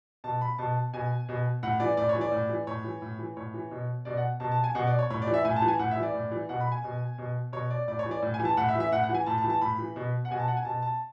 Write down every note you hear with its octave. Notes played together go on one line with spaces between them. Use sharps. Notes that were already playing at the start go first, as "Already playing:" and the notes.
B2 A5
B5
B2 A5
B2 G#5
B2
A2 F#5
E3 D5
A2 D5
C#5
E3
D5
A2
E3
A2 C#5
E3
A2
E3
A2 C#5
E3
B2
B2 D5
F#5
B2 A5
A5
G#5
B2 F#5
D5
C#5
A2 C#5
D5
E3
E5
A2 G#5
A5
E3
G#5
A2 F#5
E5
E3
D5
A2
E3
B2 F#5
B5
G#5
B2
B2
B2 C#5
D5
A2 D5
C#5
E3
D5
A2
G#5
E3
A5
A2 F#5
E5
E3
E5
A2 F#5
F#5
E3
G#5
A2 A5
A5
E3
A5
A2 B5
E3
B2
F#5
B2 G#5
A5
F#5
G#5
B2 A5
A5